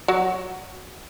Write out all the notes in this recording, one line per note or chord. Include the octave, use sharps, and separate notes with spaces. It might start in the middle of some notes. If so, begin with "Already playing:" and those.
F#3